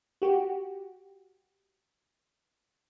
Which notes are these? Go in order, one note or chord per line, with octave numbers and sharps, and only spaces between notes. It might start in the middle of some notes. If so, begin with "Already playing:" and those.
F#4 G4